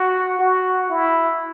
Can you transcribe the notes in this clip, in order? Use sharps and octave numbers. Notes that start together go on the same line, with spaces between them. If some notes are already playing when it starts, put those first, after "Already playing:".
Already playing: F#4
F#4
E4